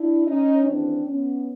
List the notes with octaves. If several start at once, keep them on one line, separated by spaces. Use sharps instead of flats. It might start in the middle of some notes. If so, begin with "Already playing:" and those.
Already playing: D4 E4
C#4 D#4
D#2 C#3 E3 C4 D4
B3 C#4